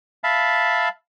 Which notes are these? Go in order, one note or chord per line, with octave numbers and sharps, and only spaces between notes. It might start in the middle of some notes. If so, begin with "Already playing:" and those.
E5 F5 A5 B5